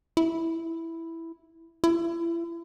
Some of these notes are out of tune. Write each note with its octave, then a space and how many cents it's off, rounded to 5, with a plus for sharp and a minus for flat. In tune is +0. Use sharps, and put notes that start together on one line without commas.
E4 +0
E4 +35